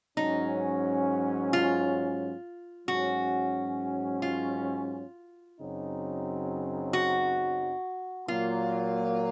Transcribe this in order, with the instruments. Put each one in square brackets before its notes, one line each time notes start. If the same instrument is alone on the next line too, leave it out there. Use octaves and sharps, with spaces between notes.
[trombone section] G#2 F#3 C#4 [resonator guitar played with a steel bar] D#4
[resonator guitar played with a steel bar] F4
[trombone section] G#2 F#3 C#4 [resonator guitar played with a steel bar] F#4
[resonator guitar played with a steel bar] F4
[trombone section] F#2 C#3 F#3 C4 D#4
[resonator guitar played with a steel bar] F#4
[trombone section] A#2 F#3 A#3 [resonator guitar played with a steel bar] F4